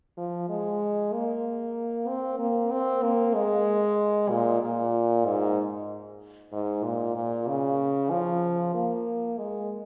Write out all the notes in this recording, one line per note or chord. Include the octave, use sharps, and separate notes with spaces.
F3
G#3
A#3
C4
A#3
C4
A#3
G#3
A#2
A#2
G#2
G#2
A#2
A#2
C#3
F3
A#3
G#3